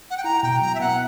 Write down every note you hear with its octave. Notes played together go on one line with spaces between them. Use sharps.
F#5
G5
E4 A#5
B2 G5
F#3 A#5
E5
B3 F#5